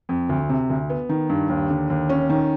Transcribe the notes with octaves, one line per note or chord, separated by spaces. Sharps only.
F2
D2
C3
D2
B3
D#3
G2
D#2
D3
D#2
C#4
D#3